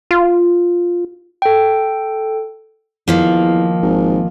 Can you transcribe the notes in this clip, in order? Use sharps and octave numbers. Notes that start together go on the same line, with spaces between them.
F4
A4 G5
E2 D#3 F3 A#3
G#1